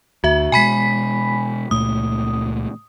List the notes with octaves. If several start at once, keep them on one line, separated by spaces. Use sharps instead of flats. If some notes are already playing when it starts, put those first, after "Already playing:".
D2 F#4 E5
B2 G#3 G#5 B5 B6
C#2 A#2 A3 D#6